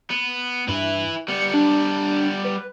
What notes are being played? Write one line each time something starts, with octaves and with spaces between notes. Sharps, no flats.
B3
G2 E4 B4
G3 B3 C#7
D4
B4